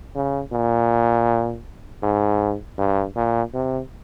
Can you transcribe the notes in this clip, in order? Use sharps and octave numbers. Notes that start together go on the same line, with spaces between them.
C#3
A#2
G#2
G2
A#2
C3